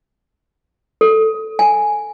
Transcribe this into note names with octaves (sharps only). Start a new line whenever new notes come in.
A4
G#5